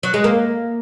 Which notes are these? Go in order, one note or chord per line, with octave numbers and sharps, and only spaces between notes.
F#3
G#3
A#3